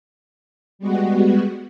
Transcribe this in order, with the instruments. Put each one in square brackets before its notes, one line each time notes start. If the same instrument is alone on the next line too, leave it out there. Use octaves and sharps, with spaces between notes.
[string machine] G3 G#3 B3 F#4